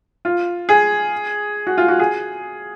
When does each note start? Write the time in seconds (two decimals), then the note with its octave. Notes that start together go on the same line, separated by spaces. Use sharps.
0.25 F4
0.69 G#4
1.67 F#4
1.78 F4
1.88 F#4
1.99 G#4